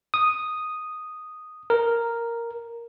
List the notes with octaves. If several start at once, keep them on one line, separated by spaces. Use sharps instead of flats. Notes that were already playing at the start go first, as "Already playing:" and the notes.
D#6
A#4